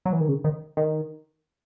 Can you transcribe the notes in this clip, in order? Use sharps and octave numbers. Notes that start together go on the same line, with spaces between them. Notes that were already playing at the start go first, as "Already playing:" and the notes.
F#3
E3
D#3
C#3
D#3
D#3